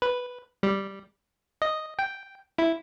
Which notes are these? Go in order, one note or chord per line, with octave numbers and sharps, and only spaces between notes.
B4
G3
D#5
G5
E4